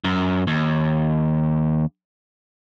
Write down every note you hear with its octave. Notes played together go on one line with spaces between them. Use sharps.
F#2
D#2